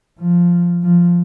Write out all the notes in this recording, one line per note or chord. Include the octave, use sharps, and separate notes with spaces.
F3
F3